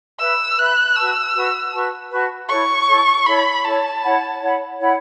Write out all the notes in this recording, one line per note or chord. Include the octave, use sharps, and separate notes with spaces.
B4 E5 B5 E6
B4 E5 B5 F#6
F#4 B4 A5 C#6 E6
F#4 B4 A5 C#6
F#4 B4 A5 C#6
F#4 B4 A5 C#6
E4 A4 C#5 C#6
E4 A4 C#5
E4 A4 C#5 B5
E4 A4 C#5 A5
E4 C#5 F#5 B5
E4 C#5 F#5 B5
E4 C#5 F#5 B5